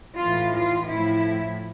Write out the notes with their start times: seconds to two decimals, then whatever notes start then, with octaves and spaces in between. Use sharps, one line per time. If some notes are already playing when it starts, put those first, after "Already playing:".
0.18 A2 E3 F4
0.55 F4
0.89 A2 F3 E4